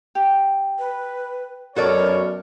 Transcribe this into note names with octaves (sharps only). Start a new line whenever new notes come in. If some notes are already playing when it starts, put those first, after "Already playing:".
G4
B4
F#2 B2 F#4 A4 A#4 C#5 D5